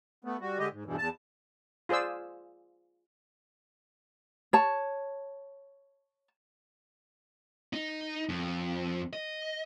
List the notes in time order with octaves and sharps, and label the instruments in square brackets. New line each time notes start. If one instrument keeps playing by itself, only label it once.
[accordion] A3 B3
G3 F#4
D3 G#3 G4 D#5
G#2
E2 G2 B2 E3
E2 A5
[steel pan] F4 G#4 C5 D5 E6
[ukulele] C#5 A5
[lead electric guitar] D#4
F2
D#5